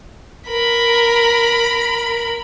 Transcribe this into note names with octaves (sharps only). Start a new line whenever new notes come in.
A#4 B5